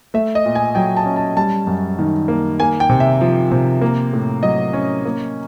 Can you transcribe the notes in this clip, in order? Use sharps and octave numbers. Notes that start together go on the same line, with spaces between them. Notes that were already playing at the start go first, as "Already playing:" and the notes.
A3 E5
D#5
A#2
G#5
F#3 G5
A5
C#4
A5
G3 A5
F#2
D#3
A#3
A#3 G#5
G5
C3
E5
F3
C3
A#3
A2
F#3 D#5
C#4
A#3